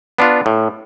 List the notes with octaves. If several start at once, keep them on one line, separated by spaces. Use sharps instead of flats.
B3 D4 F4
A2